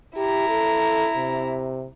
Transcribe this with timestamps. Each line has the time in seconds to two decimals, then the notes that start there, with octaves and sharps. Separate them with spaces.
0.17 E4 G4 A#5
0.49 A4
1.16 C3